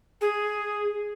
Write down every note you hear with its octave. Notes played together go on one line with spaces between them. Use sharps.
G#4